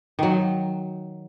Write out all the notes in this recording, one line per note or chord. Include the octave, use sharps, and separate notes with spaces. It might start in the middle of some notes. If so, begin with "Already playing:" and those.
D#3 F#3